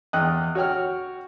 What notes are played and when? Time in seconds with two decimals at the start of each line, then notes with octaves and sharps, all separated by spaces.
0.13 E2 D#5 G5 D#6 F#6
0.55 F#4 C#5 G5 F6